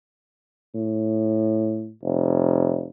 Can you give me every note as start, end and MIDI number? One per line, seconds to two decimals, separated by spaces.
0.74 1.91 45
2.03 2.87 29